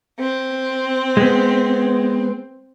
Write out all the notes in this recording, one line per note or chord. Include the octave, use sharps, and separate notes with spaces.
C4
G#3 B3